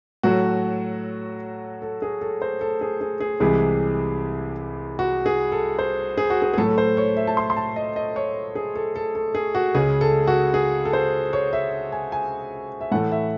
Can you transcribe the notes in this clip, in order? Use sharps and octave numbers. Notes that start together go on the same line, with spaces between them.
A2 F#3 A3 F#4
A4
G#4
A4
C5
A4
G#4
G#4
G#4
C2 C3 E3 G#3 G#4
F#4
G#4
A4
C5
G#4
F#4
G#4
G#4
A2 F#3 A3 A4
A4
C5
C#5
E5
A5
C6
C6
A5
D#5
D#5
C#5
G#4
A4
A4
A4
G#4
F#4
C#2 C#3 G#3 G#4
A4
F#4
G#4
A4
C5
C#5
E5
G#5
G#5
E5
A2 E3 A3 F#5
E5